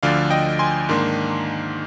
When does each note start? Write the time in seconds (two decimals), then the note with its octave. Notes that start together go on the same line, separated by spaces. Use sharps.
0.03 D2 D3 F3 D5 F5
0.30 D#5 G5
0.59 G#5 C6
0.89 G#2 D#3 A#3 D4